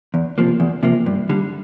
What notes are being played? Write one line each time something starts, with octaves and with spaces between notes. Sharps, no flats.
E2
C3 F3 A#3
E2
C3 F3 A#3
G2
D3 G3